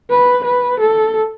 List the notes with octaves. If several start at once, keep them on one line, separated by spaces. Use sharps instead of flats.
B4
B4
A4